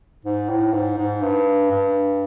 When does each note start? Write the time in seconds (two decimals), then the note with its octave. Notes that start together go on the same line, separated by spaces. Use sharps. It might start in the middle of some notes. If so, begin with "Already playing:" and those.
0.25 G#2
0.50 A2
0.73 G#2
0.98 G#2
1.22 G2
1.71 G2